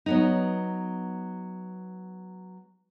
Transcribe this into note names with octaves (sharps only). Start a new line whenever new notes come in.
F#3 B3 D#4